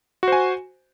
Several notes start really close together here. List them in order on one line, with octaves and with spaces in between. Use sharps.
F#4 C5 G#5